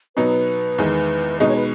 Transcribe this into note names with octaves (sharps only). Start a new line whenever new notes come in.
B2 F#3 B3 D#4 B4
E2 D#3 G#3
B2 G#3 D#4 D#5
C#5
B4